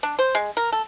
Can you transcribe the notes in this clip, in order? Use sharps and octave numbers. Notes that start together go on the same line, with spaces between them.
D4
C5
G#3
A#4
A4